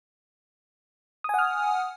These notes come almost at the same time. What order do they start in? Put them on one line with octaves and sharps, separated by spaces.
D#6 G#5 F#5 F6